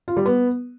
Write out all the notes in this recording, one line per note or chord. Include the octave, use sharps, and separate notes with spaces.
F4
G3
B3